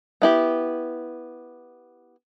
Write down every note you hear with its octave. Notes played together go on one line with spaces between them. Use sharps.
B3 E4 G4